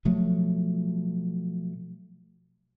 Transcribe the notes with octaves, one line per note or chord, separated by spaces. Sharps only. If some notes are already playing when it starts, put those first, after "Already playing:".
B2 F3 F#3 A3